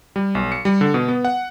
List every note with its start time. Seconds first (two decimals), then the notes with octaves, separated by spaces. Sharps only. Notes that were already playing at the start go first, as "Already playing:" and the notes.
0.16 G3
0.35 B1
0.52 C#7
0.65 G3
0.81 D3
0.94 B2
1.08 B3
1.25 F#5